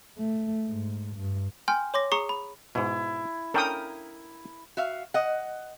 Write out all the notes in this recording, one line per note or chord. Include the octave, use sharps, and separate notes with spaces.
A3
G#2
G2
G5 G#5 C6 F6 G6
C#5 C6 D6 A#6
G#4 A#5 C#6 D#6 C7 C#7
B5
G#2 B2 E4
C#4 D4 A4 A#4 G5 D#6
F#4 E5 F5
D#5 F#5